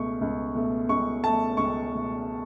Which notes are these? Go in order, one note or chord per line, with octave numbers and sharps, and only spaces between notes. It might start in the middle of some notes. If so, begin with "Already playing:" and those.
Already playing: C#2 B2 A3 C#6
C#2
B2 A3
C#2 C#6
B2 A3 A5
C#2 C#6
B2 A3